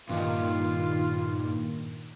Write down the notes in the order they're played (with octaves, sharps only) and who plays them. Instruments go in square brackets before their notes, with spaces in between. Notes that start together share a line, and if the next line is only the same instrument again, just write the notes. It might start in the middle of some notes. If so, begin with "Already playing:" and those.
[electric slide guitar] G2 [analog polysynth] A#2 D#3 [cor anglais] F4